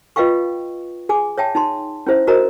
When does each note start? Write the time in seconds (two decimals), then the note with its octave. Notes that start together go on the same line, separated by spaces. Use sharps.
0.16 F4 B4 D#5 F5 G5 C#6
1.09 G#4 G#5 D6
1.38 C#5 E5 G5 A5
1.55 D#4 A5 C6
2.07 C#4 E4 C5 E5
2.27 F#4 A#4 C5 D5 D#5 A#5